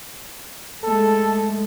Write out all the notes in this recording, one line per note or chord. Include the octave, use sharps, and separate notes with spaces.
G#3 A3 A4